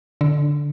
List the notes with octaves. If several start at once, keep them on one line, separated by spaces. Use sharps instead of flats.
D3